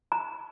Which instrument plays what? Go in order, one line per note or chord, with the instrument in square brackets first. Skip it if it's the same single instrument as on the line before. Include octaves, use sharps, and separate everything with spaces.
[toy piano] A#5